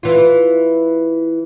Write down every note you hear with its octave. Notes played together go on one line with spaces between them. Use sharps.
E3 F4